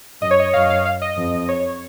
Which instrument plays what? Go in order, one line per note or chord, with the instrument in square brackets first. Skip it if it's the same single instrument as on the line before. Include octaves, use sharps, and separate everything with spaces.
[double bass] F#2 [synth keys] D#5
[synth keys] C#5
D#5
[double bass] F#2 [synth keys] F5
[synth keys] F5
F5
D#5
[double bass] F2
[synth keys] C#5